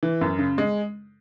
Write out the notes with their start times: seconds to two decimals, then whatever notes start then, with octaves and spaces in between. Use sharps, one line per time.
0.03 E3
0.21 F#2
0.39 C#3
0.58 G#3